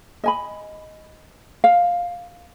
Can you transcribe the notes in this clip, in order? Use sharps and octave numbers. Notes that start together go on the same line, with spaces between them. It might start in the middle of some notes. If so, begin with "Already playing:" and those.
D#5 G#5 B5
F5